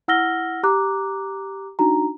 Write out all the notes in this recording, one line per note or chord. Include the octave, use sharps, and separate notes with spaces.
E4 F#5 E6 F6 A#6 G7
G4 A#5 D6 F#6
D4 D#4 F#4 A#5